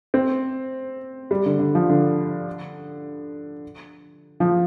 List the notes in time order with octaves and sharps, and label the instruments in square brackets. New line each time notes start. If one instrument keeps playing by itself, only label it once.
[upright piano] C4
G3
D3
D3
F3
D3
F3